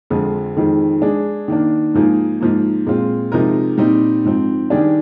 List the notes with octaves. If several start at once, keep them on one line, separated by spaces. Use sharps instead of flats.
F2 D3 F3 G#3
F2 D#3 G#3
G#3 D4 G#4
D#3 A#3 D4
G#2 F3 A#3 D#4 G#4
G#2 F3 A#3
A#2 G#3 C4 F4
C3 F3 G#3 D#4 A#4
A#2 G3 C4 D#4
G#2 F3 C4
D#3 G3 D4 G#4 D5